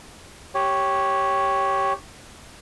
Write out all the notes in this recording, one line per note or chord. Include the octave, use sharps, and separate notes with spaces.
G4 C#5